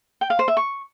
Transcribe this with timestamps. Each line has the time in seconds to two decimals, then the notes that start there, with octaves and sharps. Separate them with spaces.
0.21 G5
0.30 F5
0.39 C5
0.48 E5
0.57 C#6